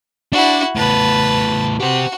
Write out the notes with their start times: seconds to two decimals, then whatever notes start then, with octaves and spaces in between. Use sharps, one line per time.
0.33 D4 E4 F#4
0.76 A2 B3 B4 A5
1.80 F#4 G4 C5